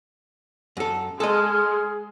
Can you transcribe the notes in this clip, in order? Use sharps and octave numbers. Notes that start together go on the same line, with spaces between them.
F#2 A4
G#3 G#4 A4 D#5 C6 F6